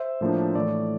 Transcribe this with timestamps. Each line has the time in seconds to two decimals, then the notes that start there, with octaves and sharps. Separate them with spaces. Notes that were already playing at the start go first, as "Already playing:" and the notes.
Already playing: C5 E5
0.21 A2 F3 A#3 D4
0.55 A2 E3 A3 D5